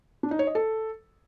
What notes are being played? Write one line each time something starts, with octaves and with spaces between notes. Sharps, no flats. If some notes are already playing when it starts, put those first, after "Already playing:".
D4
D#4
C#5
D#5
A4